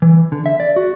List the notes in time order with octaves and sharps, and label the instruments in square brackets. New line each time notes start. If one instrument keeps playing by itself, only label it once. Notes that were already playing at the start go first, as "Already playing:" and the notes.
[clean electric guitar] E3
D3
E5
D5
F#4